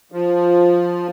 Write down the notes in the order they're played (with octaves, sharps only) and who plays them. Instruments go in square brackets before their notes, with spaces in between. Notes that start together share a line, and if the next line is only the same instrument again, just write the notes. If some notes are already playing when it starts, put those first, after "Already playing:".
[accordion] F3